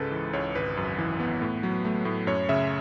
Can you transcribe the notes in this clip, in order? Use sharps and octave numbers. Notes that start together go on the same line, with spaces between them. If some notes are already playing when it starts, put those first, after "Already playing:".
Already playing: C#2 G#2 C#3 G#3 A4 B4
E3
C#2 C#5
G#1 B4
F#2
E3
B3
A2
F#3
A3
A2
F#2 C#5
C#3 E5